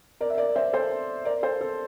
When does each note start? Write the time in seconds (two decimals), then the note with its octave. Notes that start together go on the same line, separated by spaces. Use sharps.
0.21 A#4 D5
0.30 E5
0.38 A#4 D5
0.55 C5 E5
0.73 A4 C5
1.25 A#4 D5
1.43 A4 C5
1.61 A4